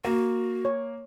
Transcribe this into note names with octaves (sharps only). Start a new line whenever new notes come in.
A#3 F#4
C#5